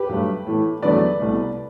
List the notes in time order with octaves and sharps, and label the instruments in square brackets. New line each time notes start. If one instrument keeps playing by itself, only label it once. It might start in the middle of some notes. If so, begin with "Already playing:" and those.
Already playing: [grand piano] G4 B4
G2 F#3 A3
A2 E3 A3
E2 D3 F#3 A3 B4 D5
C2 B2 A3